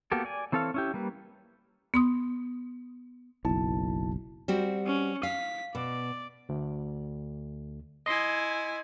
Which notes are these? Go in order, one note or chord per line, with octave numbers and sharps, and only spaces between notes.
A#3 B3 F#4 G4 A4
D5 G#5
E3 C4 A4 C#5 F5
C#4 E4 G4
G3 A#3 B4
B3 C6 D#6
F#1 B1 E4 A5
G3 C4 F#4
C#4
F5 B6
B2 D5
D2
E4 D#5 G#5 C6